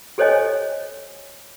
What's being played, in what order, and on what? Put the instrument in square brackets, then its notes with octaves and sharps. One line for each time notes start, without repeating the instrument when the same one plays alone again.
[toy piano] G4 A4 C5 C#5 D#5 G#5